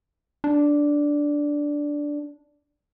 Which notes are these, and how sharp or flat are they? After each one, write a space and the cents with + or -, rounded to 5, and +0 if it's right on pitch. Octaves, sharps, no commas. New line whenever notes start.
D4 -5